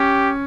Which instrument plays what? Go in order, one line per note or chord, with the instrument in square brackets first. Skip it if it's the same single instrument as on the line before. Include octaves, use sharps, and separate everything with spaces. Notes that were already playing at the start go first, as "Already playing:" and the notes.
Already playing: [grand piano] C#4 [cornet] G4